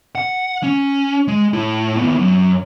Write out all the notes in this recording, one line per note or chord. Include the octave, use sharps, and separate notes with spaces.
F#5
C#4
G#3
A2 E4
D#2 B3
F#2